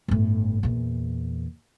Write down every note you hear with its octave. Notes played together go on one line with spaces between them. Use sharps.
G1 A2
E2 A#2